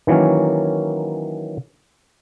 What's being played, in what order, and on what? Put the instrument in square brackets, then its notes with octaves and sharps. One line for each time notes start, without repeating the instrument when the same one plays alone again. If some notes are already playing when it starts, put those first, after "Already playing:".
[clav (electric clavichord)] D#3 E3 F#3 A#3 C#4